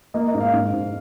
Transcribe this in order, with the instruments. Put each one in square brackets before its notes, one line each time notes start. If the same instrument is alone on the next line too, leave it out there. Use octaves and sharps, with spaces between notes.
[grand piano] A#3 D#5
D#5
G#2
F5
G#2
G#2